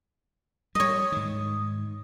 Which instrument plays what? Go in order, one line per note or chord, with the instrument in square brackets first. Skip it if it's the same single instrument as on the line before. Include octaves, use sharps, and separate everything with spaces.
[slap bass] G3 [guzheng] C#5 D#5 [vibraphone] D#6
[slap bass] G#2 D#3